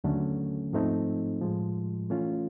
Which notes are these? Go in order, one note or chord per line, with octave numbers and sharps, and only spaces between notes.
D#2 D3 F#3 A3 C#4
G#2 F3 A3 C4 D#4
A2 F3 G#3
E3 A3 C#4 F4